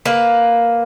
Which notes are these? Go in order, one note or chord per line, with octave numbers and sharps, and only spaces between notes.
A#3 B4